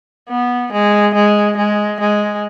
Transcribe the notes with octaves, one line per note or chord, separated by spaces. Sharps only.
B3
G#3
G#3
G#3
G#3